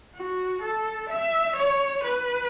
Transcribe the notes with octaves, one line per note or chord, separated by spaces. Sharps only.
F#4
A4
E5
C#5
B4